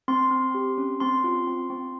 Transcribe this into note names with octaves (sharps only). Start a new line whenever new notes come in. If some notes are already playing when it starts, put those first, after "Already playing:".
C4 C6
C4
G4
C#4
C4 C6
F4
C4
C4